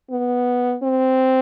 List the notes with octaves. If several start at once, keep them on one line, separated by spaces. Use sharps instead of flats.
B3
C4